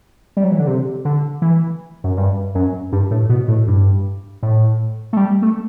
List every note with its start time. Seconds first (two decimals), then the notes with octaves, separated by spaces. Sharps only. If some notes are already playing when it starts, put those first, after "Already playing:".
0.37 G3
0.44 F#3
0.52 E3
0.59 D3
0.67 C3
1.05 D3
1.42 E3
2.04 F#2
2.17 G2
2.55 F#2
2.92 G2
3.11 A2
3.29 B2
3.48 A2
3.67 G2
4.43 A2
5.13 A3
5.17 G3
5.42 A3